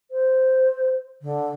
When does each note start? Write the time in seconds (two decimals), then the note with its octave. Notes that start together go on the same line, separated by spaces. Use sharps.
0.11 C5
1.21 D3